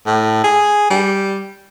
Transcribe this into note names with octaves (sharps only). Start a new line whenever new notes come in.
A2
G#4
G3